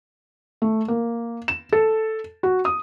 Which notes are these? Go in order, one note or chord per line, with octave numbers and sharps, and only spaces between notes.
A3
A#3
E7
A4
F#4
D#6